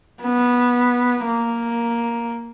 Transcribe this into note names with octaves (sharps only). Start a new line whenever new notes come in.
B3
A#3